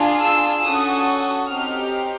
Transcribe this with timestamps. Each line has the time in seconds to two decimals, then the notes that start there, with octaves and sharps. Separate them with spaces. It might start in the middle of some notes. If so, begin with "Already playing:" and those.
Already playing: D4 F4 G#4
0.22 E6
0.65 C#4 F#4 A4 D#6
1.50 C4 D#4 G4 F6